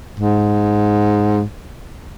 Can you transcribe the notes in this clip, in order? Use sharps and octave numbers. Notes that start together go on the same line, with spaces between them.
G#2